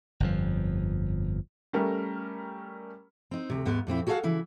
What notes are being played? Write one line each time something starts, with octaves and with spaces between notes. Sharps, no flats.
G1 F2 F3
G3 A3 C#4 A#4
C4 D#4
D2 C3
D#2 G#2 B3
F2 A#2 C4 E4
F#4 G#4 A4 B4 F5 F#5
C#3 E3 E4